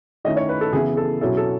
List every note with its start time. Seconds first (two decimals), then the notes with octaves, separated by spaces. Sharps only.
0.25 D#3 A3 C#4 E4 D#5
0.37 C#5
0.49 B4
0.61 A4
0.73 C#3 E3 B3 E4 G#4
0.97 A4
1.21 B2 F#3 C#4 E4 A4
1.37 A4